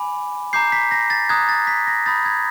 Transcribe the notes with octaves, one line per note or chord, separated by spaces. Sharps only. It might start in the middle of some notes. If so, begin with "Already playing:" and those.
Already playing: G#5 B5 D6
A#5 D6 G6 C7
B6
A#6
A6
A#5 D#6 F#6 G#6
A6
B6
A#6
B5 D#6 G6 A6
G#6